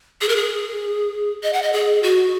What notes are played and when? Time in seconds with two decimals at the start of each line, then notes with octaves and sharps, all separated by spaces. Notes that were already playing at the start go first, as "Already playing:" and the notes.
0.21 G#4
0.28 A#4
0.36 G#4
1.43 D#5
1.53 F#5
1.62 D#5
1.72 G#4
2.03 F#4